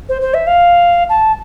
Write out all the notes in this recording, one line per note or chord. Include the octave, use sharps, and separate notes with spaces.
C5
C5
E5
F5
A5